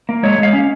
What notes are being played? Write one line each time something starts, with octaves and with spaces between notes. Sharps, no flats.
A#3
G#3 C#5
G#3 F5
C#4